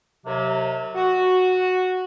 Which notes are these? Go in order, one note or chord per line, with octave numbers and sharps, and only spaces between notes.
D#2 C3 F#3
F#4